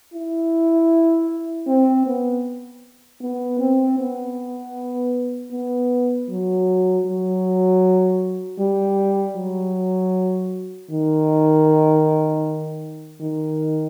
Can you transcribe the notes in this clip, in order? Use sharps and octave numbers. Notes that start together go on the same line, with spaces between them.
E4
C4
B3
B3
C4
B3
B3
F#3
F#3
G3
F#3
D#3
D#3